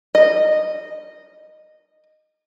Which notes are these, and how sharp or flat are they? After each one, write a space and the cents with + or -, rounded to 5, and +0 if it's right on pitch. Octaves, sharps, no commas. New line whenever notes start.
D#5 -10